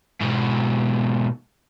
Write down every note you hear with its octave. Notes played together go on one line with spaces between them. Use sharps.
G#2 B2